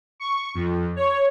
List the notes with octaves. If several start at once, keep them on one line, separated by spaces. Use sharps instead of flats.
C#6
F2
C#5